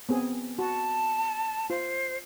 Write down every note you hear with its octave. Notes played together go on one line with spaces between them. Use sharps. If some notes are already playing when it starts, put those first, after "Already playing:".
B3 C4 G#4
F#4 A5
F4 C5